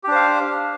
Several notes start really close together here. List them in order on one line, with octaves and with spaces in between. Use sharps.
G4 D4 C5 F5